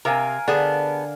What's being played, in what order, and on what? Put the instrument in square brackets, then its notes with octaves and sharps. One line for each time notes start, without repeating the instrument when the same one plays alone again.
[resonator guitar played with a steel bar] C3 [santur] A#4 F5 G#5
[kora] D3 [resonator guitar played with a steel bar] B3 G#4 A5